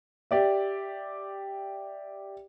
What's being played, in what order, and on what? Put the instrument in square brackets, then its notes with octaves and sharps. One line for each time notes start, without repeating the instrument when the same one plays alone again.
[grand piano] G4 D5 E5